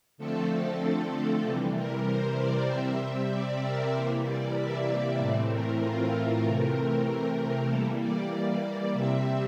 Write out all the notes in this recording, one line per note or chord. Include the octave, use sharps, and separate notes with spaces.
D3 F3 A3 C4 A4
C3 E3 G3 A4
A#4
C5
D5
C3 G3 C4 E5
D5
A#4
C3 E3 G3 A#3 C5
D5
E5
D5
A2 E3 A3 C4 D5
A#4
F4
C3 E3 A3 C4 A#4
E3 G3 A#3 A4
D5
C3 G3 C4 E5